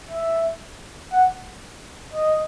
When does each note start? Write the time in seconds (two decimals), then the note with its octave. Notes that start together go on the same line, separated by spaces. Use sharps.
0.11 E5
1.12 F#5
2.14 D#5